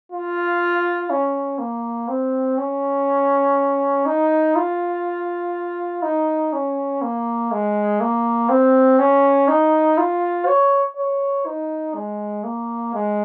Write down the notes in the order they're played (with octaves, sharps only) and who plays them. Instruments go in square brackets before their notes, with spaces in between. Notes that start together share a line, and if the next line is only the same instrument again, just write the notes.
[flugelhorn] F4
C#4
A#3
C4
C#4
D#4
F4
D#4
C#4
A#3
G#3
A#3
C4
C#4
D#4
F4
C#5
C#5
D#4
G#3
A#3
G#3